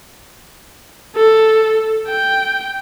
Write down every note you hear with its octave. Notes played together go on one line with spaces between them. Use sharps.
A4
G5